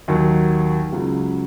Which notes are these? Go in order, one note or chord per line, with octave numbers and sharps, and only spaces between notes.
D#2 D#3 F#3
C#2 C#3 F#3